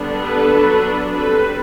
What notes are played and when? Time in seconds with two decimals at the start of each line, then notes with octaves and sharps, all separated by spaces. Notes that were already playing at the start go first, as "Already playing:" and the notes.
Already playing: D3 G3 B3 D4
0.20 A4 B4
0.53 F#3 B3 D4
1.16 G3 C4 A4 B4